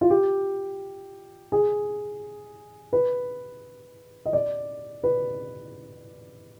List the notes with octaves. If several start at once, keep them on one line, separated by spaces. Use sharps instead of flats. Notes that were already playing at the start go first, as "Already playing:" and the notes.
F4
G4
G#4
B4
D#5
D5
B4